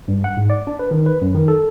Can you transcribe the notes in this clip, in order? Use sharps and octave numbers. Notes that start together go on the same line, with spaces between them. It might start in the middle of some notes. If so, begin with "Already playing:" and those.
G2
F#5
G#2
D5
D4
B4
D#3
B4
F#2
D#3
A4